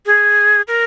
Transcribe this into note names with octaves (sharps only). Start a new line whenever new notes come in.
G#4
A#4